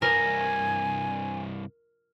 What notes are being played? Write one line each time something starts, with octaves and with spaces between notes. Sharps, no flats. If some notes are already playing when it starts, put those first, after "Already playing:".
C2 G2 A#4 G#5